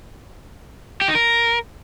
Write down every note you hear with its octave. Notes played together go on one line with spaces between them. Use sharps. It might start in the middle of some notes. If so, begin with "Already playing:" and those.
G4
D#4
A#4